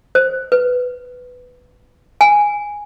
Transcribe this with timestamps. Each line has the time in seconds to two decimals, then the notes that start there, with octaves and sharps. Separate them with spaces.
0.15 C5
0.52 B4
2.21 G#5